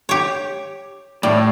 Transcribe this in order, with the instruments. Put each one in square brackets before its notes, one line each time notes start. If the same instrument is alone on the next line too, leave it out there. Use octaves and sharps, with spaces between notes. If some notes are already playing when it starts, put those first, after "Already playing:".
[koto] G4 C#5
[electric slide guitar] A2 [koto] G3